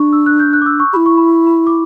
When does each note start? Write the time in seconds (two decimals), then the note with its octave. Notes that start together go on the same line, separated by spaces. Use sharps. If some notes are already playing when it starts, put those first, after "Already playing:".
Already playing: D4 C#6
0.13 E6
0.26 F#6
0.40 G6
0.53 F#6
0.62 D6
0.66 E6
0.80 C#6
0.93 E4 G4 B5
1.06 C#6
1.17 B5
1.47 B5
1.67 D6